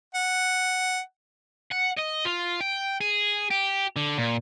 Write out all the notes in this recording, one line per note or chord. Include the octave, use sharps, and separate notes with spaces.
F#5
F#5
D#5
F4
G5
G#4
G4
D3
A#2